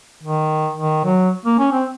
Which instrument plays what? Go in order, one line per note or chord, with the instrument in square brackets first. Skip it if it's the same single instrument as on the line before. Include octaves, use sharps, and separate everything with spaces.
[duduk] D#3
D#3
F#3
A#3
C#4
C4